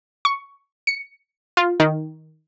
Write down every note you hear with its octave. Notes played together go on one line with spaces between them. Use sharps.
C#6
C#7
F4
D#3